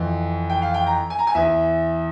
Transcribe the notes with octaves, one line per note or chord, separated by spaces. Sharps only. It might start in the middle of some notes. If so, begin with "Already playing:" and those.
Already playing: F2 E3
G5
F5
G5
A#5
G#5
A#5
G#5
E2 E3 E5